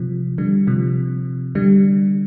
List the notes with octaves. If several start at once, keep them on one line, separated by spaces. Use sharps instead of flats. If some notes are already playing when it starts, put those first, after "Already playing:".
Already playing: C3 F3
D3 G3
C3 F3
D3 G3